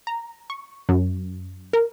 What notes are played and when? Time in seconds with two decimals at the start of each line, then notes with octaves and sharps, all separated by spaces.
0.07 A#5
0.50 C#6
0.89 F#2
1.73 A#4